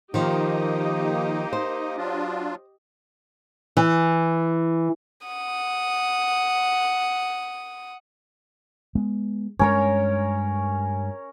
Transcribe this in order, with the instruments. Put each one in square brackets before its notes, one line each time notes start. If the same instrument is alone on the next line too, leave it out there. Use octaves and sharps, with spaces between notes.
[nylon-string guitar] D#3 F3 [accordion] A#3 D#4 [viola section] G4 D#5
[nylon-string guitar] C5
[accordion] F#3 D4 F4
[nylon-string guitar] E3
[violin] F#5 D#6
[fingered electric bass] G#3 B3
[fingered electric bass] G2 G#3 [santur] C#4 A#4 C#5